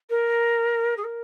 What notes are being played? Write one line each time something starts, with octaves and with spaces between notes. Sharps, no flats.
A#4
G#4
A#4